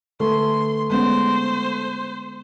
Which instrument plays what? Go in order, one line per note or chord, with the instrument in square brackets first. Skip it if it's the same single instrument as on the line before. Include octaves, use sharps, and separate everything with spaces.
[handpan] D3 B4 [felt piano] A3 [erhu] C6
[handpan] G#3 B3 C#4 [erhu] C5